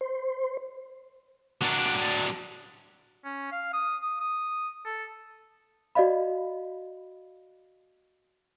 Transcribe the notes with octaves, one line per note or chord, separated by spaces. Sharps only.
C5
F#3 D4
C#4
F5
D#6
D#6
D#6
A4
F#4 D5 D#5 F5 B5